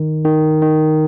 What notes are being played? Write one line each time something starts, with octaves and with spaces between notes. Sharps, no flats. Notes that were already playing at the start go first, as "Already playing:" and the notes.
Already playing: D#3
D#3
D#3